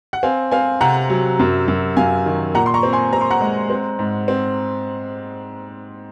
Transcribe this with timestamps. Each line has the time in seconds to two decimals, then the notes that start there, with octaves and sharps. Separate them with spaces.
0.13 F#5
0.23 C4 F5 G#5
0.51 C4 F5 G#5
0.81 C3 F#5 A#5
1.10 F#3
1.39 F#2
1.68 F#2
1.97 F#2 F5 G#5
2.26 D#3
2.55 A#2 F#5 A#5
2.66 C6
2.74 A#5 C#6
2.83 C4
2.93 G#5 C6
3.13 C4 A#5
3.21 C6
3.30 F#5 A#5
3.41 G#3
3.70 C4
3.99 G#2
4.28 C4